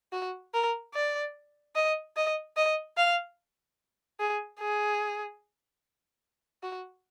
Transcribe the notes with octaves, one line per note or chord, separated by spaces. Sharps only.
F#4
A#4
D5
D#5
D#5
D#5
F5
G#4
G#4
F#4